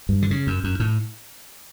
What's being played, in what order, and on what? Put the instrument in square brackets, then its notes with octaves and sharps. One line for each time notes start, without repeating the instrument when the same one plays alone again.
[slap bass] G2
D3
C#3
F#2
F#2
A2